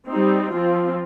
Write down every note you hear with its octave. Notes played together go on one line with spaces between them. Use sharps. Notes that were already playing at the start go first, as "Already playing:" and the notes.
G3 C4 D#4
F3 C4 F4